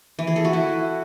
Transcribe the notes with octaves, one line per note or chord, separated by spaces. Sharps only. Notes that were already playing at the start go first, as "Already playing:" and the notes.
E3
G#4
A4
F#4
E4